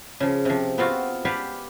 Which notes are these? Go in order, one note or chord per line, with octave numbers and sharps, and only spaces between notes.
C#3 F3
C3 F3
B3 C4 F4 F#4 F5
G4 B4 D5 F5 F#5 G#5